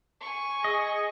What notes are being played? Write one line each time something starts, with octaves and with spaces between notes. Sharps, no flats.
G#5 C#6
G#4 D#5